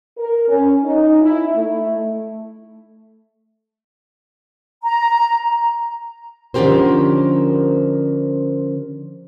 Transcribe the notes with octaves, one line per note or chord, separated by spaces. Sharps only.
A#4
C#4
D#4
E4
A3
A#5
D3 F3 C#4 G4 A#4 C5